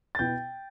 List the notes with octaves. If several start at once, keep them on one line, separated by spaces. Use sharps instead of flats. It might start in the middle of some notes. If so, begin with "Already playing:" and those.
A6
B2 B3 E4 G5 G6